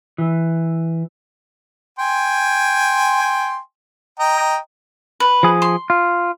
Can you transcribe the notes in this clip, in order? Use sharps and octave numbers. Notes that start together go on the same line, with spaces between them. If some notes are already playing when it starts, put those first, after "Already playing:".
E3
G5 G#5 C6
D#5 G5 A#5
B4
F3 G#4
C6
F4